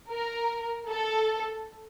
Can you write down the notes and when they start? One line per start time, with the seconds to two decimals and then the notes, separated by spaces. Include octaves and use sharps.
0.12 A#4
0.87 A4